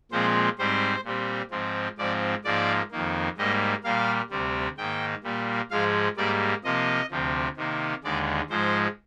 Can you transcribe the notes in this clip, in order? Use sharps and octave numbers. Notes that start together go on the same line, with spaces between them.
A#2 F3 G#3 C4 C5
G#2 G3 C4 C5
A#2 G3 C4
G#2 F3 C4
G#2 F3 C4 D5
G#2 F3 A#3 D5
F2 D#3 A#3
G#2 G3 A#3 D#5
A#2 G3 A#3 F5
D2 C3 G3 C4
G#2 D#3 A#3 G5
A#2 G3 A#3
G#2 F3 G#3 F5
G#2 G3 A#3 D5
C3 F3 A#3 D#5
D2 C3 F3 C4
C3 D#3 A#3
D#2 D3 G#3 D5
G#2 F3 G#3 C5